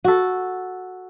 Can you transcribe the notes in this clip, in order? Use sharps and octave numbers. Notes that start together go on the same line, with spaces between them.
F#4 A4